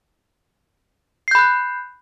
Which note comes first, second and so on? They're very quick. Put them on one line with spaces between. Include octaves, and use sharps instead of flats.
C7 G6 B5 F#6